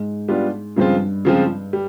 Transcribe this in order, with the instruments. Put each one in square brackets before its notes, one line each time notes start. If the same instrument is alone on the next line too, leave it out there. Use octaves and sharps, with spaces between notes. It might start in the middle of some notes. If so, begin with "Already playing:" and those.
Already playing: [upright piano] G#2
[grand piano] G3 B3 D4 F4
[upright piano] G2 [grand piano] C#3 F3 G#3 C4 F4
[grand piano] C#3 F3 G#3 C4 F4
G3